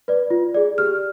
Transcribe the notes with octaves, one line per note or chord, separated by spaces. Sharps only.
B4 D5
F4
G#4 D5
G4 F6